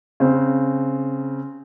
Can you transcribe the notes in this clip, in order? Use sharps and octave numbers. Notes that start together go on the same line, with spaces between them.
C#3 C4